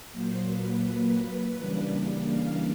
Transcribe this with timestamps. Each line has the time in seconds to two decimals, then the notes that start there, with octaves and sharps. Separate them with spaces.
0.12 A#2 F#3 A#3 C5
0.49 B4
0.85 B4
1.56 C#3 E3 G3 A#3 D4
2.29 F5